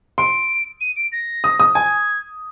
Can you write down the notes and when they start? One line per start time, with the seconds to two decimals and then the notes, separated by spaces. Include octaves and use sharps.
0.18 C6 D7
0.81 D#7
0.96 D7
1.12 A#6
1.44 D#6
1.60 D#6
1.75 G#5 G#6